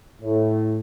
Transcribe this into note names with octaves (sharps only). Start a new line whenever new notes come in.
A2